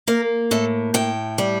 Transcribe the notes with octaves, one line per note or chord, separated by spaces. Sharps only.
A#3 A#4
A2 A4
A2 G5
G3